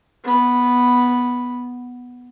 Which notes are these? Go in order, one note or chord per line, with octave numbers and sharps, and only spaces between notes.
B3 B5